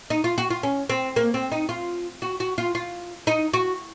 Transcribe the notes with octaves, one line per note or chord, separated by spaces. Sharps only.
D#4
F4
F#4
F4
C#4
C4
A#3
C4
D#4
F4
F#4
F#4
F4
F4
D#4
F#4